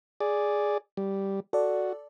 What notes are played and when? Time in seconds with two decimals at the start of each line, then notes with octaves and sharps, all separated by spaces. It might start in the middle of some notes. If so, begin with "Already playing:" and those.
0.20 G#4 D5
0.97 G3
1.53 F#4 A4 D5